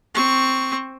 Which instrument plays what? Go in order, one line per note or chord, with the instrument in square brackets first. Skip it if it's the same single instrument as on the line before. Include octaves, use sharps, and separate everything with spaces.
[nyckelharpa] C4 C#6